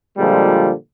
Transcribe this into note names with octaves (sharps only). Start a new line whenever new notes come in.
A#2 D3 F3 G3 G#3